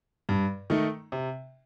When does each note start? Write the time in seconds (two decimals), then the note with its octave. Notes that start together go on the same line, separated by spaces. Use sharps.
0.29 G2
0.70 D#3 A3 D#4
1.12 C3